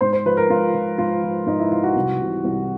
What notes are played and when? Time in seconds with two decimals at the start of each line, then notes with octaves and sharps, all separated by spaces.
0.01 G#2 C5
0.13 C5
0.25 F3 B4
0.37 A#4
0.50 G#2 F4
0.74 F3
0.98 G#2 F4
1.23 F3
1.46 G#2 D#4
1.60 E4
1.72 F3 F4
1.83 F#4
1.95 C2
2.20 C3 E3
2.44 C2